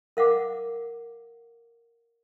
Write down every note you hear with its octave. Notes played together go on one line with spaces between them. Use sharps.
A#4 F5 F#5 D6